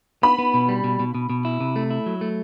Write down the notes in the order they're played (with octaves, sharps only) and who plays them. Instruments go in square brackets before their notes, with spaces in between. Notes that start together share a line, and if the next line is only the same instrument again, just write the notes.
[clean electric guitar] B3 [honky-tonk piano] B5
[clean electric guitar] B3
B2
G3
B2
B2
B2
B2
E4
C3
A3
E4
F#3
A3